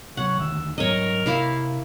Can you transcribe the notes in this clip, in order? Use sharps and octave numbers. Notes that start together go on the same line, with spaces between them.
C3 F#3 C#5 F#5
D#2 D3 D#3 E5
G#2 F#3 C#4 A#4 C#5 D#5
C3 A#3 E4 F5